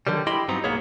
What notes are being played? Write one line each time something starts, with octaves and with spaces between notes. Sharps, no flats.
D3 D#3 F#3 G3
E4 G4 D#5 G5 B5 C6
G2 F#3 B3 C4 D#4 A#5
B1 A#3 B3 G#4 C#5